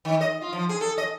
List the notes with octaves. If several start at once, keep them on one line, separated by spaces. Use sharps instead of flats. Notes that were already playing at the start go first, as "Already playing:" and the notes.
D#3
D#5
F4
F3
G#4
A4
D#5